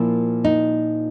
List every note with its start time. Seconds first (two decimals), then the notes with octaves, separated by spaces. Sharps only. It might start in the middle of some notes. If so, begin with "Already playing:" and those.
Already playing: A#2 F3 A#3 E4
0.44 D#4